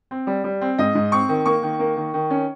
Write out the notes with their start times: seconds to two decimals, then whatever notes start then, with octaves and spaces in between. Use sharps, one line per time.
0.11 C4
0.27 G3
0.44 G3
0.61 C4
0.79 G#2 D#5
0.95 G#2
1.12 C4 C#6
1.29 D#3
1.46 A#3 C#6
1.63 D#3
1.79 A#3
1.97 D#3
2.14 D#3
2.30 C#4